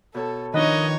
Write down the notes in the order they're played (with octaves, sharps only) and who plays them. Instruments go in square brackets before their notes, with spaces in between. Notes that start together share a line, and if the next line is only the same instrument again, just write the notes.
[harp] B2 C#5 A5 [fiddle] A4
[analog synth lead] D#3 [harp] F3 D4 B4 [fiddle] D#4 C#5 [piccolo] D#5